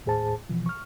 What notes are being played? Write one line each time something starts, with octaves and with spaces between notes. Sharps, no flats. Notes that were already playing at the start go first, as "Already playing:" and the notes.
D#2 A2 G#4 C5 A5
B2 E3 F3
C#6 F6